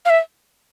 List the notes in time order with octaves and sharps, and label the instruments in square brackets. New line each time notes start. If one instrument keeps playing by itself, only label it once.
[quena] F5
E5